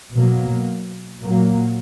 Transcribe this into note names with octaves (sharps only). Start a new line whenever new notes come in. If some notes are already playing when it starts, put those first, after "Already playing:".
B2 F#3 A#3
A#2 F#3 A#3